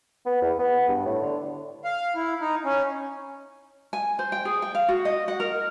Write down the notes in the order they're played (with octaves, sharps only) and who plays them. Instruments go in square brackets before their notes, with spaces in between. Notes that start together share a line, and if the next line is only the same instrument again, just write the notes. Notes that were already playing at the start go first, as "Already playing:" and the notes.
[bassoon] B3
E2
B3
G2
A2
D3
[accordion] F5
E4
D#4
C#4
[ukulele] G#5
C5
G5
G#4
G5
F5
F#4
D#5
F#5
A#4